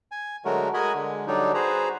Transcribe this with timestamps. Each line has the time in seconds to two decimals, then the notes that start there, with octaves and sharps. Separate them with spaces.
0.12 G#5
0.45 D3 F#3 G#3 A3 F#4 A#4
0.74 G#3 F#4 A#4 D#5 G#5 B5
0.94 D3 G#3
1.27 D3 F#3 G3 D4 D#4
1.54 F#4 G#4 B4 C5 A#5